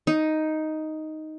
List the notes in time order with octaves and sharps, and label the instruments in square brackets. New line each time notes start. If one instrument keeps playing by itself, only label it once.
[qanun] D#4